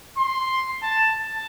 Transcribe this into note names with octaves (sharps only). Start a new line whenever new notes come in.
C6
A5
A5